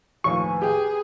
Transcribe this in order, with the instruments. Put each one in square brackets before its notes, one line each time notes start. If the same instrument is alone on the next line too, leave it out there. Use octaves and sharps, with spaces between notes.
[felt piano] D#2 A2 F3 [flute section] B4 G#5 [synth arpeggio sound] C#6
[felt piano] G4 G5 [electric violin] G#4